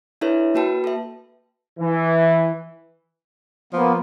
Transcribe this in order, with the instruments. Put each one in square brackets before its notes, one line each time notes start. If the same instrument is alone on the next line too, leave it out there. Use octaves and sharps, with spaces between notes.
[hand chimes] D4 E4 A4 B4 C#5 E5
A#3 F#4 B4 G5 A5
A4 E5
[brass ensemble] E3
[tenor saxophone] F3 [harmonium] A#3 B3